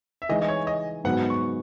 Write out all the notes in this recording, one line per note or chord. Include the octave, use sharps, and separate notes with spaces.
E5
E3 G#3 D#4 D#5
D#5
C#5
D#5
G#2 F#3 B3 F#5
C#6